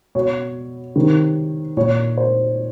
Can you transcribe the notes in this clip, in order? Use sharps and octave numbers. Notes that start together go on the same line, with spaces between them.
B2 C#5
C3 D#3
A#2 C#5
C5